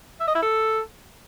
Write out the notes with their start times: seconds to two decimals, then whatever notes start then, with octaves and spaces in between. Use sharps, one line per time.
0.20 E5
0.27 D#5
0.35 E4
0.42 A4